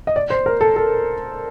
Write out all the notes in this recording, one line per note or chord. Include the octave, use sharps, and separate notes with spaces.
D#5
D5
C5
A#4
A4
A4